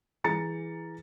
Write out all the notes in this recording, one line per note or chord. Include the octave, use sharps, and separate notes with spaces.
E3 G#4 A#5 A6 C#7